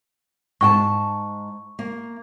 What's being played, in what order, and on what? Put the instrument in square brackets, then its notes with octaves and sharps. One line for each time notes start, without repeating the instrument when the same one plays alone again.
[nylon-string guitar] G#2 G5 A5 [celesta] C#6
[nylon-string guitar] A#3